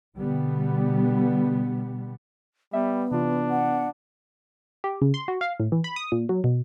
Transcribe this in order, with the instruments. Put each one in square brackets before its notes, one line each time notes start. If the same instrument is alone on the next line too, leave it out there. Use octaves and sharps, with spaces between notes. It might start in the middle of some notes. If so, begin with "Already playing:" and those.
[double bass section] B2 D3 G3 B3
[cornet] G3 [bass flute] B3 [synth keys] E5
[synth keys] C3 E3 F4 [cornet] D4
[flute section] F#5
[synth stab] G4
C#3
C6
F#4
F5
A2
E3
B5
D#6
A#2
F#3
B2